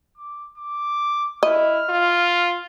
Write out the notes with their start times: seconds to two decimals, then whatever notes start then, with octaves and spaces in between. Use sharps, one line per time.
0.17 D6
0.58 D6
1.43 E4 D#5 F6
1.89 F4